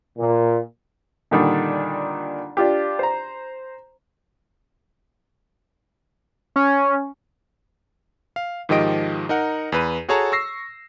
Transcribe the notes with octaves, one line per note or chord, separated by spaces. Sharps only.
A#2
A#2 D3 D#3 G3 D4
D4 F4 G4
C5 A#5
C#4
F5
G#2 D#3 F3 G4 D#5 D7
D#4 A#4 F#5
E2 B4 D#7
F#4 G#4 A4 C#5 A5 A#5
C#6 E6 A#6 C7